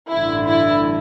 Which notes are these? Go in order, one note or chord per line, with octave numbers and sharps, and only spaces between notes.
A1 G2 D3 E4
E4